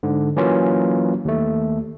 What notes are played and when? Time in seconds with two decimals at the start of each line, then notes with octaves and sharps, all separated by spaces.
0.03 G#2 D3
0.37 E3 F#3 A#3 C#4 F4
1.25 D#2 A3